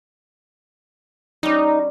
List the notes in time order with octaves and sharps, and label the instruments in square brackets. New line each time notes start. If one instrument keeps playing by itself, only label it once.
[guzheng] G3 C#4 [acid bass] D#4